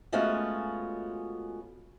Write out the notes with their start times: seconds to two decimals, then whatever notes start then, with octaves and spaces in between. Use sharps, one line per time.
0.12 G#3 A3 B3 C#4 F4 F#4